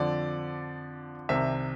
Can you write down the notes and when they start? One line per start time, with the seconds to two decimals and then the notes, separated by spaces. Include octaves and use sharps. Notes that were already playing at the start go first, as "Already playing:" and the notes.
Already playing: F2 D3 F3 D5
1.29 C2 C3 D#3 E5